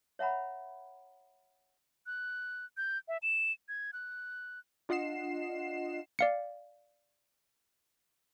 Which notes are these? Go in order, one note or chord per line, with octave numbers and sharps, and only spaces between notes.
C#5 E5 F#5 A#5 B5
F#6
G6
E5
E7
G#6
F#6
D4 F4 D#5 F#5 C7 E7
D5 F5 C#7